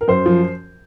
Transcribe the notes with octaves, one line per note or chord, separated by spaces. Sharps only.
A#4
F#2 C5
F3